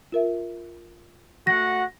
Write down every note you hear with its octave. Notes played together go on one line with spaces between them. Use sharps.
F4 A#4 E5
A3 F#4 F#5 A#6